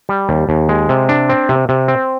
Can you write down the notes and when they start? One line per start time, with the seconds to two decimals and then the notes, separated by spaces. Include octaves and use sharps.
0.09 G3
0.29 D#2
0.49 D#2
0.69 G#3
0.89 C3
1.09 D4
1.29 C4
1.49 C3
1.69 C3
1.88 C4